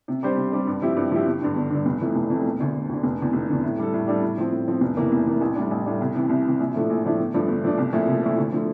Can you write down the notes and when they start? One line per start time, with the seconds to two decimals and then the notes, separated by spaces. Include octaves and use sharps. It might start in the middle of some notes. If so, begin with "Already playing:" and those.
0.08 C3
0.23 G3 D4 G4 C5
0.37 C3
0.52 G3 D4 G4 C5
0.67 G2
0.82 F3 C4 E4 G4
0.96 G2
1.11 F3 C4 E4 G4
1.26 G1
1.41 G2 D3
1.56 G1
1.70 G2 D3
1.86 F1
2.01 F2 E3 A3
2.16 F1
2.30 F2 E3 A3
2.45 E1
2.60 D2 D3
2.75 E1
2.89 D2 D3
3.03 F1
3.18 E2 D3
3.33 F1
3.48 E2 D3
3.64 A2
3.78 G3 D4 A4
3.93 A2
4.07 G3 D4 A4
4.23 A2
4.38 F3 C4
4.52 A2
4.68 F3 C4
4.81 F1
4.97 E2 C3 E3 A#3
5.12 F1
5.27 E2 C3 E3 A#3
5.41 A1
5.55 A2 G3 D4
5.71 A1
5.86 A2 G3 D4
6.01 C2
6.15 C3 E3
6.29 C2
6.45 C3 E3
6.59 A#1
6.74 A2 F3 A3 D4
6.90 A#1
7.04 A2 F3 A3 D4
7.19 G1
7.34 G2 F3 A3 D4
7.48 G1
7.63 G2 F3 A3 D4
7.78 C2
7.93 A#2 F3 A3 E4
8.08 C2
8.23 A#2 F3 A3 E4
8.38 D2
8.52 D3 F3 A3